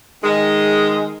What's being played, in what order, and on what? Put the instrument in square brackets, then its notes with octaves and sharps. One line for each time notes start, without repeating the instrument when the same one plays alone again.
[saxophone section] D#3 G#3